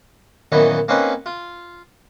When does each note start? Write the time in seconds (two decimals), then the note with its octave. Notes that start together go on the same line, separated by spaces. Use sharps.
0.52 F#2 A#2 D#3 E3 B3 D#4
0.88 A#3 C4 C#4 D#4 B4
1.26 F4